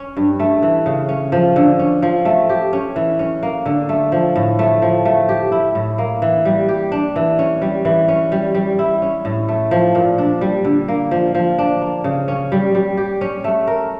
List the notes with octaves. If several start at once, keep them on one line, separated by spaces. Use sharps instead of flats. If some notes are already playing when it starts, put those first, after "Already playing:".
Already playing: C#4
G2
A3
E3
C#3
C#4
F3
D3
C#4
F3
A3
G4
C#4
E3
C#4
A#3
D3
A3
F3
A2
A3
F3
A3
G4
E4
A2
A#3
E3
G3
G4
D4
E3
C#4
G3
E3
C#4
G3
G3
E4
C#4
A2
A3
F3
A#2
D4
G3
D3
A#3
F3
F3
D4
A#3
C#3
C#4
G3
G3
G4
C#4
A3
A#4